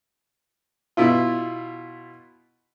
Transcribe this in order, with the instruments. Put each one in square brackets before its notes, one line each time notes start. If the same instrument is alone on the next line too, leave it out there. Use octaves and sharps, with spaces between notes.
[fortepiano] B2 E4 F4